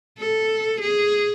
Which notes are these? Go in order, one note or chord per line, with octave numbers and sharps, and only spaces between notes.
A4
G#4